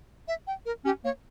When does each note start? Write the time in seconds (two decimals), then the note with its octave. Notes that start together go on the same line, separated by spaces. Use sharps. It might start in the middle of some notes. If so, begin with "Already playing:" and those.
0.28 E5
0.47 G5
0.66 A#4
0.85 C#4 G4
1.04 A#3 C#5